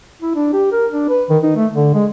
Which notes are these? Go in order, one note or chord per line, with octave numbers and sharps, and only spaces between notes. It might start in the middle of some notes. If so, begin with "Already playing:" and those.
E4
D4
G4
A#4
D4
B4
D#3
D#4
A3
D3
G#3